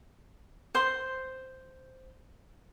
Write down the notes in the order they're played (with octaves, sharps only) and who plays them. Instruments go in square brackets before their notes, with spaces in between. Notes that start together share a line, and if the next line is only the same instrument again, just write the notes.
[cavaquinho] C5 C6